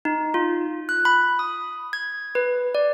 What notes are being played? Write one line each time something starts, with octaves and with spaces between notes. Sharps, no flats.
D#4
F4
F#6
B5
D#6
G#6
B4
D5